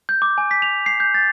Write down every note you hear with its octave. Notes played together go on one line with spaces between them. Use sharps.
G6
D6
G#5
B6
F7
C7
G6
A6